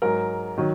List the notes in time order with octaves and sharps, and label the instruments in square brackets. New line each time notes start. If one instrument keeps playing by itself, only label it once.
[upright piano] G#2 F#3 A#4
D#3 F#3